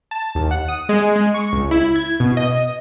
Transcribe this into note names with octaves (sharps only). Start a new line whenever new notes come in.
A5
D#2
F#5
D#6
G#3
G#3
C#6
C#2
E4
G#6
B2
D#5